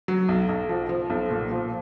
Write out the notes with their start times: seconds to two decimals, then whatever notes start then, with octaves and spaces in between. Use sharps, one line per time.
0.08 F#3
0.29 B1
0.49 B1
0.69 F3
0.89 F3
1.10 B1
1.30 A#2
1.51 F3